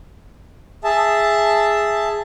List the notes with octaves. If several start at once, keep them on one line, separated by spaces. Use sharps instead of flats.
G#4 E5 A5